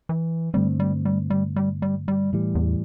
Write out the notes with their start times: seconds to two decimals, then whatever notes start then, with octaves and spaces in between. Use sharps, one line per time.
0.09 E3
0.54 G2 D3 G3 A3 C4
0.80 G3
1.05 G3
1.30 G3
1.56 G3
1.82 G3
2.08 G3
2.33 A2 E3 G3
2.55 E2